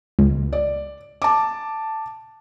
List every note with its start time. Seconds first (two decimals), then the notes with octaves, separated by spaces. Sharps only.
0.19 C#2
0.53 D5
1.22 A5 D6